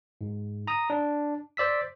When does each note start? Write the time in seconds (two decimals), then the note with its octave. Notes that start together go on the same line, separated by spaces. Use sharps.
0.21 G#2
0.67 A#5 D#6
0.90 D4
1.57 C5 D5 E6 B6